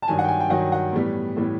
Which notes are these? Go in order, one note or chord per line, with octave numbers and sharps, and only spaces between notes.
A5
G2 D#3 F#3 G#5
F#5
G5
G#5
G5
G2 D#3 F#3 F#5
F#5
A2 E3 G3 B3
A2 E3 G3 B3